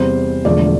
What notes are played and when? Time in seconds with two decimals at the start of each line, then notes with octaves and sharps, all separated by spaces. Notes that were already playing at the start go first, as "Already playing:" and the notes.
Already playing: E2 C3 G3 C5
0.45 E1 E2 D3 F3 A3 D5